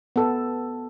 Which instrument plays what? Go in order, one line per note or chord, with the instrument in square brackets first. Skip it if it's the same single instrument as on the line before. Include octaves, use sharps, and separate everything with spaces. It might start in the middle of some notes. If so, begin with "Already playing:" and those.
[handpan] B3 A4